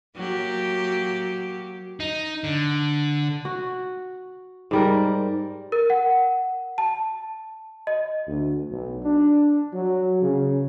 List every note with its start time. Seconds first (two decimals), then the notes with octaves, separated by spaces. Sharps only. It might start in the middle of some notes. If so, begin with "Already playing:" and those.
0.16 F#3 A#3 G4
2.00 D#4
2.44 D3
3.45 F#4
4.71 G#2 G3 A#4
5.72 A#4
5.90 F#5
6.78 A5
7.87 D#5
8.27 D2
8.69 B1
9.03 D4
9.74 F#3
10.22 C#3